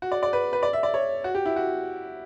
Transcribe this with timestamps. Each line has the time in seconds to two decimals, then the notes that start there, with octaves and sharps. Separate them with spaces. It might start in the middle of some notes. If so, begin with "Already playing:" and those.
0.02 F#4
0.12 D5
0.23 D5
0.33 B4
0.53 B4
0.63 D5
0.73 E5
0.83 D5
0.94 C#5
1.24 F#4
1.35 G4
1.46 E4
1.56 F#4